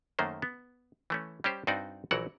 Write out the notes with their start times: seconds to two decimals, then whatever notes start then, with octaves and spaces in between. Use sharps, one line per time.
0.19 F#2 D#3 A3 A#3 C5
0.42 B3
1.10 E3 A3 C#4
1.44 G3 C#4 G4 C5
1.67 G2 C4 D#4 F#4 D5
2.11 A#1 E3 F#3 F#4 A#4 F#5